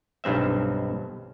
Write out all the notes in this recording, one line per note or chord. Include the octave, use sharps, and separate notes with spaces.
B1 G2 C4 E5